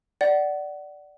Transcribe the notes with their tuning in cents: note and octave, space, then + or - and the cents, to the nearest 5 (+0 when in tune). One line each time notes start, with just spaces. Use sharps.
D5 +0 F#5 +20